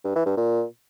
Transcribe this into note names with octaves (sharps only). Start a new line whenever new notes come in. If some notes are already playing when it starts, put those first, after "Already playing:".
G2
E3
G2
A#2